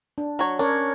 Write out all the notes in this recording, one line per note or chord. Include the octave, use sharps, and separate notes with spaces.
D4
F#3 C#5
C#4 D4 A#4 C#5